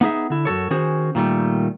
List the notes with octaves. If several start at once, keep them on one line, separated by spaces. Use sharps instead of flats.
B3 D#4 G#4 E5
D3 E4
F#2 F#4 A4 C#5
D#3 C#4 F#4 G#4 C5
A#2 D#3 G3 A3